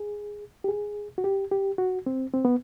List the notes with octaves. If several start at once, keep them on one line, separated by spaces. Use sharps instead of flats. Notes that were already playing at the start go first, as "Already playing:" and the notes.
Already playing: G#4
G4
G#4
F#4
G4
G4
F#4
C4
C4
B3